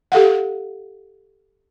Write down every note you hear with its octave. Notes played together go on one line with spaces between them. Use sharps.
G4 A4 F5 F#5